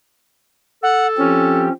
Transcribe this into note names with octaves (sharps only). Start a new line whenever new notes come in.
A4 F#5
F3 C4 C#4 G4